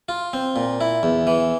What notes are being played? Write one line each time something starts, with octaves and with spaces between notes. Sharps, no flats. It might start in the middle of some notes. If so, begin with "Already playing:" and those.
F4
C4
A#2
E4
E2
E3